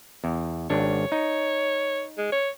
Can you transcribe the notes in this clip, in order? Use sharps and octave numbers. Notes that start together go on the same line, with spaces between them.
E2
G#1 D4 C#5
D#4
G#3
C#5